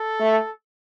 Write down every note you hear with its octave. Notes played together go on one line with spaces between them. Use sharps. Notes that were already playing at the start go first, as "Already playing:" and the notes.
Already playing: A4
A3